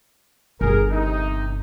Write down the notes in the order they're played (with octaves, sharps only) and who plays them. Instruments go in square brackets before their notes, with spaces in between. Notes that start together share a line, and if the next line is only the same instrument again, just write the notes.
[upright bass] G1 [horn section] G#4 A#4
[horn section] C3 D#4